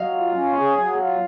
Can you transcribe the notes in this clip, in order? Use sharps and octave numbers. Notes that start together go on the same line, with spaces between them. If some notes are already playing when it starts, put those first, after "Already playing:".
Already playing: F#3 D#5 F5
F4
C#4
G#4
F#3
F4